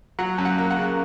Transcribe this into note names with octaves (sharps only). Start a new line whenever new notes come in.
F#3 F#5
F#2
F#5
A#3
F#5
C#3